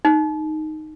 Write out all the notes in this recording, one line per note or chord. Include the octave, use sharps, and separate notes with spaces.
D#4